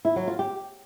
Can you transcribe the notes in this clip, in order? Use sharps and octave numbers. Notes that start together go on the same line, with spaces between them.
E4
F#3
F4
G4